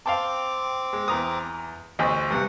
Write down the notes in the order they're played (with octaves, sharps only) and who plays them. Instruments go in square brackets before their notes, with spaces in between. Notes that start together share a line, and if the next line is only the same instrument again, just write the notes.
[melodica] C4 D6 [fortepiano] F5 G5 A5
[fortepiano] G#3
E2 A#5 D#6
[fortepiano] A1 D2 D#5 [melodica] C5
[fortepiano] G2 C3 [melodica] F#5